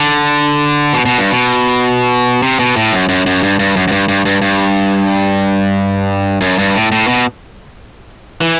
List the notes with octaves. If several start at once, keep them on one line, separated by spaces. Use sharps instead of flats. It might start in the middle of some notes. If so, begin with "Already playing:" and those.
Already playing: D3
B2
B2
G2
B2
C3
B2
A2
F#2
F#2
F#2
G2
G2
F#2
F#2
G2
G2
G2
G2
F#2
G2
A2
A2
B2
E3